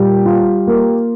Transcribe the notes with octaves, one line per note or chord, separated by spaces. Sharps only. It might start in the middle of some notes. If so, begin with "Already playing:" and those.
Already playing: A#2 G3 G4
F4
A#3